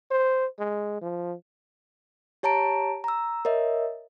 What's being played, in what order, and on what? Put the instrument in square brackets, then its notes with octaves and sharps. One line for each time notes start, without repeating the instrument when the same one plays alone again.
[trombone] C5
G#3
F3
[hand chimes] G4 C#5 A5 A#5 D7
A#5 E6
A#4 C#5 D#5 E5